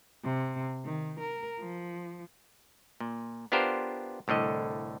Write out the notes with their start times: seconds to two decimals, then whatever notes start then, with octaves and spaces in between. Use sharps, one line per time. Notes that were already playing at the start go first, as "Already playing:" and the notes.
0.24 C3
0.85 D#3
1.20 A#4
1.60 F3
3.00 A#2
3.52 B3 D4 F4 G4 A#4 C5
4.28 C2 A2 D3 D#5